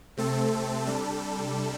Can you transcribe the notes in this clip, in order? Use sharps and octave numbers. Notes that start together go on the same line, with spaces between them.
C3 A3 C4 A4
C3 G3 D4 A4